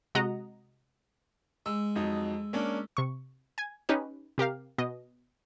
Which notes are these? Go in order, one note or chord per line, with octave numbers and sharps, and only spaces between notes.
C3 G#3 F#4 D#5 F#5 A#5
G#3 E6
F2 F#3 D#4
A#3 C#4 D4
C3 C#6
G#5 G#6
C#4 D#4 G4 B4
C3 G4 A#4 F5
B2 D#5